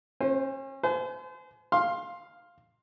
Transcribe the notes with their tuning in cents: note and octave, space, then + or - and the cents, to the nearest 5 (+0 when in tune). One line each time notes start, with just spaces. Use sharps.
C#4 -40 C5 +0
C5 -35 G#5 +35
F5 +0 C6 +15